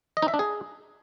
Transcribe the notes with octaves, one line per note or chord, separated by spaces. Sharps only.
D#5
D#4
E5
D4
G#4